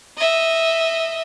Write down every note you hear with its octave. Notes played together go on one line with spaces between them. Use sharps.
D#5 E5